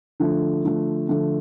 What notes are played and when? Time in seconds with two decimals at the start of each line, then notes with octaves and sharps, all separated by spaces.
0.20 D3 F3 A3
0.64 D3 F3 A3
1.09 D3 F3 A3